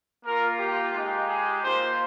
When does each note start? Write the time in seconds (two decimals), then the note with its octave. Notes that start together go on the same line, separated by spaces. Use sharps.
0.24 A#3 F4 A#4
0.58 G4
0.94 G#3 D#4 G4
1.28 G#4
1.63 A#3 F4 C5